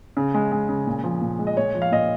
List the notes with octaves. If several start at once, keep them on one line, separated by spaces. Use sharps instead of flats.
C#3
G#3
G#3
C#3
A#2
F3
A#2
G#3
D#5
A#2 C#5
F3
F5
A#2 D#5